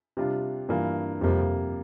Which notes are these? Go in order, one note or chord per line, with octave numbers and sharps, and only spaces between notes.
C3 G3 D4 F4
G2 E3 A#3 F4
F2 C3 G3 A#3